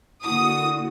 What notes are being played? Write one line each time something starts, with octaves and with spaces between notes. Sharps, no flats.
D3 A#3 E4 F#4 D#6